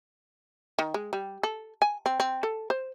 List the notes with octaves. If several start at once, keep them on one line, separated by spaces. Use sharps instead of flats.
D#3
G#3
G3
A4
G#5
C4
C4
A4
C5